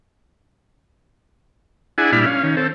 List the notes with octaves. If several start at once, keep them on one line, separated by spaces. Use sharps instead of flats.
D4 E4 G#4 F#5 G#5
A#2 G3 D4 E4 B5 F6
C#4 F5
D#3 C#4
C4 A4